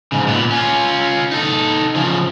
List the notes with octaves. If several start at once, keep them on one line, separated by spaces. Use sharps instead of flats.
G#2 C#3
A#2 B3
C#4 F4
D#4 A4
C#3 F3